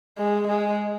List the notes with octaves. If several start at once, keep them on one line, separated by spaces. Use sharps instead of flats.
G#3
G#3